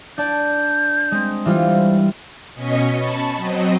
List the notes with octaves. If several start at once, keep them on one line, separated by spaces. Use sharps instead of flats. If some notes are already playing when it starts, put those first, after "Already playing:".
D4 D5 G6
G#3 C4
E3 G3 F4 C5
B2 C#4 D#5 C#6 B6
A5 B5 C#6
F#3 C4 D#5